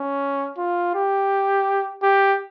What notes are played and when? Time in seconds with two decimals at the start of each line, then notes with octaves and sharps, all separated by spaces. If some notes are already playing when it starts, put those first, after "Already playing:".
Already playing: C#4
0.58 F4
0.95 G4
2.03 G4